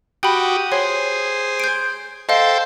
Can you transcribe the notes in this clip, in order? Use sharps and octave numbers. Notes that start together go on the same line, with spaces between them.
F#4 G4 G5 B5 D#6
G#4 C5 C#5
G6 D7
A4 C5 D#5 F5 G5